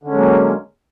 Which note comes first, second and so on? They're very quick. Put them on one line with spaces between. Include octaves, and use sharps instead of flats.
D3 C#4 G#3 F#3 A#3